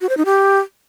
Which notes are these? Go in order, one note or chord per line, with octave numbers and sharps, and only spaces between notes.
F#4
C5
D#4
G4